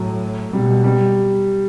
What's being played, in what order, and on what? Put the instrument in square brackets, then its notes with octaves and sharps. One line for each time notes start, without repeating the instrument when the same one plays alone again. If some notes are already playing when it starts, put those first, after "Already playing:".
Already playing: [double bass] A2 [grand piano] F#3
[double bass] B2 [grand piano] G3
[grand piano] G3